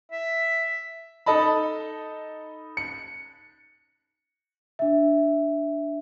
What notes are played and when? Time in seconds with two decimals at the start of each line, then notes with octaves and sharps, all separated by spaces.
0.12 E5
1.26 D#4 A4 D#5 A5 B5
2.77 C#7
4.79 D4 E5